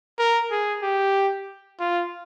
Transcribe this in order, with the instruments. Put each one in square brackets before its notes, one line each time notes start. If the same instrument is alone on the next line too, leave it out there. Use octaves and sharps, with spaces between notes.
[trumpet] A#4
G#4
G4
F4